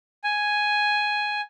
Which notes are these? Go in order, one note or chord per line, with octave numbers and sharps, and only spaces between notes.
G#5